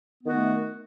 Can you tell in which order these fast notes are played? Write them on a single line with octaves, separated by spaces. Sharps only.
B3 D#3 F#4 A3